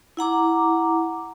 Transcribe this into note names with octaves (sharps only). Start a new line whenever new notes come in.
E4 F#5 A#5 D6